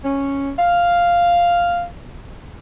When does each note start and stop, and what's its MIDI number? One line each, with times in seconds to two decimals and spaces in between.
0.04 0.51 61
0.58 1.84 77